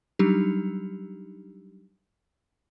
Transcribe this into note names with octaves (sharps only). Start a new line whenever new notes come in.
F#3 G3 D4 D#4 G4